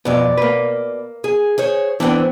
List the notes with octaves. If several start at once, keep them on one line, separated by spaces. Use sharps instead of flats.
F2 B2 B3 D5
A#3 B4
G#4
G#4 C5 C#5
E3 B3 C4 D4 C5 G5